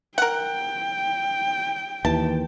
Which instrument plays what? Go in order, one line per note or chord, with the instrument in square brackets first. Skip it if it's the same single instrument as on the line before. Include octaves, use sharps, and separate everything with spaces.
[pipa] A#4 F#5 [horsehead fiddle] G5
[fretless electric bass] D#2 E3 [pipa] A5